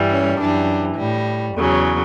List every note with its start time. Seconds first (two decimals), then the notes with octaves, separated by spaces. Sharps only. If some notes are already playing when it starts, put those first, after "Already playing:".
Already playing: G2 E3 G3
0.10 C#4
0.39 F#2 E3 G3 D4
0.97 A2 G3
1.55 E2 C#3 F#3